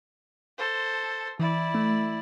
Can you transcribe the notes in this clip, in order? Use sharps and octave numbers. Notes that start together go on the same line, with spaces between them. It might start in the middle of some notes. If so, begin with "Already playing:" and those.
A4 C5
E3 E4 D5
A3